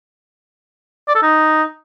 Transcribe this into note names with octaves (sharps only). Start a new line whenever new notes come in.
D5
A4
D#4